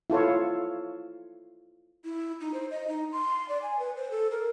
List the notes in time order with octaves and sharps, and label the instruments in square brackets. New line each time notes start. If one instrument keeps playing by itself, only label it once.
[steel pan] E4 F4 A4 C#5
[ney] E4
D#4
C5
D#5
D#4
C6
D5
G#5
B4
C5
A4
A#4